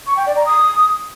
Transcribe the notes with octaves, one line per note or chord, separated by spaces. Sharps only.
C#6
G5
D5
A#5
D#6